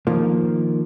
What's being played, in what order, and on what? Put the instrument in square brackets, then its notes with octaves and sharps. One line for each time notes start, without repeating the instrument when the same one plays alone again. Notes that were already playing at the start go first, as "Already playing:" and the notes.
[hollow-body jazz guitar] D#3 F3 A#3